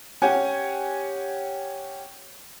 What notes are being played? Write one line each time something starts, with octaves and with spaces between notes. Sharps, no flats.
C#4 G4 F#5 G#5